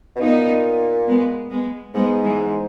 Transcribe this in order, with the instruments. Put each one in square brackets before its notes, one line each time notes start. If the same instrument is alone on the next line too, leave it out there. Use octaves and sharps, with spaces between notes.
[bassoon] B2
[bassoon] A#2 [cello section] B3 D#4
[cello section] G#3 B3
G#3 B3
[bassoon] G#2 [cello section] G#3 B3
[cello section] E3 G#3